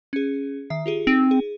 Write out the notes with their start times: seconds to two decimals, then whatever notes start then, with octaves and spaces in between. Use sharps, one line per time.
0.13 C#4 G#4
0.70 D#3 E5 C7
0.86 F4 G4 G#4
1.07 C4 D#4
1.31 G#4